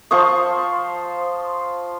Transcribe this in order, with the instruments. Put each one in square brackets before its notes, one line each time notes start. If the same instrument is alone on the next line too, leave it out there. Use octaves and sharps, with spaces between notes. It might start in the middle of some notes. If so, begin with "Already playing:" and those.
[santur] F3 C5 C#6 D#6